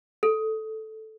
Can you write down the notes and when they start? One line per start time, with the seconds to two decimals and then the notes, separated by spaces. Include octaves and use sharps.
0.23 A4